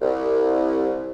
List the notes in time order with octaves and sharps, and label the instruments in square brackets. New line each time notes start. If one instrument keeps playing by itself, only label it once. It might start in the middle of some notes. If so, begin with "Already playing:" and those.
[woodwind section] C2